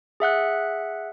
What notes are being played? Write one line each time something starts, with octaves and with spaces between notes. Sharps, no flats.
G#4 E5 F#5 F#6